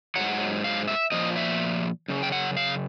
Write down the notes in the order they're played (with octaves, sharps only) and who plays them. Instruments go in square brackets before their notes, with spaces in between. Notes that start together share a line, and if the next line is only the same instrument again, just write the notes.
[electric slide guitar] G#2 D#3 F#3 F#5
F5
E5
A#2 F3 D#5
E5
F#2 C#3
G5
F#5
F5